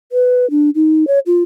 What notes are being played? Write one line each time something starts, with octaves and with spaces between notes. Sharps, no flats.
B4
D4
D#4
C#5
F4